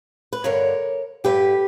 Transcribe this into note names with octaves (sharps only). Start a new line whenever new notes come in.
B4
G2 D3 A#4 C#5
G2 D3 G4 B4